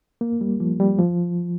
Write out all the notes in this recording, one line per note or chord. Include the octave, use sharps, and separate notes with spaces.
A#3
G3
F3
G3
F3